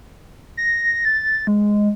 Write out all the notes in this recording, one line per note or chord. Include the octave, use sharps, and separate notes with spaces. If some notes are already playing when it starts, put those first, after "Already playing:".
A#6
A6
G#3